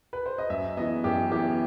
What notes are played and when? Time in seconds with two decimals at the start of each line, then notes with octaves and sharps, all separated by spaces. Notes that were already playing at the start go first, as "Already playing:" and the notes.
0.13 B4
0.26 C5
0.38 D#5
0.50 F#2 E5
0.77 E3 B3 D#5
1.04 F#2 G4
1.32 E3 B3 G4